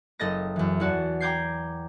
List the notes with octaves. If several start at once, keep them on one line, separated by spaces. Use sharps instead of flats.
F#1 A4 D#5 A6 A#6
F#2 E3
E2 F#4 A5
G5 A#5 D6 G6 G#6 C7